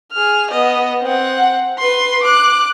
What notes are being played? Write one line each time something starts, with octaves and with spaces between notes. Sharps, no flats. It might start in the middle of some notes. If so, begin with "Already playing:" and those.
G#4 F6
B3 D#5
C4 F#5
B4 C6
D6 F#6